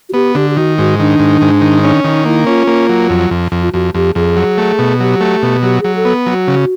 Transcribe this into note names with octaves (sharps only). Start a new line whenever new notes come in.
F#4
B3 G4
D3 G4
G4
D#3 F#4
G#2 F#4
D#3 D4
G#2
G#2
D#3
C#4 D4
D#3 D#4
A#3 E4
C#4 F4
A#3
F#3
F2
F2
F2
F4
F2 F#4
F2 G4
F2 G#4
F#3
A3
B2
F#3 G4
A3
B2
F#3 G4
F#3 G#4
A4
B3
F#3 F#4
C#3